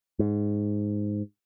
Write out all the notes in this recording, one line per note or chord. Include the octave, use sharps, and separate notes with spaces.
G#2